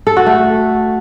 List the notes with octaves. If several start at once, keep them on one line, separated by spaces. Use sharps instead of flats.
A4
F#4
A3